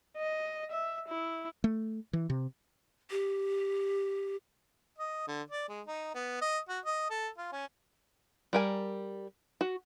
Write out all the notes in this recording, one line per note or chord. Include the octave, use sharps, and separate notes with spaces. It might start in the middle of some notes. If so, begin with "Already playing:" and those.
D#5
E5
E4
A3
E3
C3
G4
D#5
D3
D5
G#3
D#4
B3
D#5
F#4
D#5
A4
F4
C#4
G3 A#4 G#5
F#4